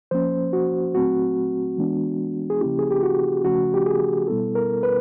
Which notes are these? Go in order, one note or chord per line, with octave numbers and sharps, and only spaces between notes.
F3 A#3 C#4 C5
F#4
A#2 F#3 A3 C4 F#4
E3 G#3 B3 D4
G#4
C#3 F3 A#3 C#4 E4 G4
G#4
G4
F#4
C#3 F3 A3 C#4 F#4
G4
G#4
B2 G3 B3 E4 A4
A#4
B4